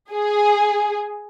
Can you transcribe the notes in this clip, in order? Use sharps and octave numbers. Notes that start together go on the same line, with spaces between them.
G#4